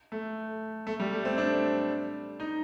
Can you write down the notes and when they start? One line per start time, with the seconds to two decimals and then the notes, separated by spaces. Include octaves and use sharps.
0.12 A3
0.87 A3
1.00 G3
1.12 A3
1.25 C4
1.38 D4
2.40 D#4